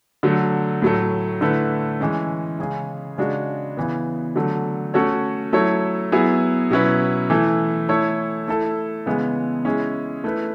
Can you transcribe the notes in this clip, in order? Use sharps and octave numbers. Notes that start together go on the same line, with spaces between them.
D3 F#3 A3
A2 F#3 A3
D3 A3 E4 B4
E3 G#3 C#4
C#3 G#3 C#4 G#4
C#3 G#3 D4 F#4
C#3 E3 B3
D3 F#3 A3
A3 C#4 F#4 A4 C#5
F#3 A3 E4 A4 C#5
F#3 B3 E4 G#4
B2 F#3 C#4 E4 B4
E3 A3 E4
A3 E4 A4 C#5
A3 E4 A4
C#3 E3 G#3 B3
G#3 C#4 E4 G#4
A3 E4 B4